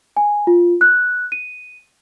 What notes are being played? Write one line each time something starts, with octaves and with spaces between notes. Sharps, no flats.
G#5
F4
F#6
D#7